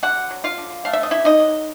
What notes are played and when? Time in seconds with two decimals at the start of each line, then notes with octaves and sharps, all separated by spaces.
0.03 D3 F#4 F#5
0.31 F#3
0.44 F4 F5
0.58 D3
0.85 A3 F5
0.93 E5
1.03 D#5
1.11 D3 E4 E5
1.25 D#4 D#5
1.40 F#3